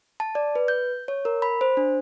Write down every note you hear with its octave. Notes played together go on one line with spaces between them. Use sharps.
A5
D5
B4
G6
C#5
A#4
B5
C5
D4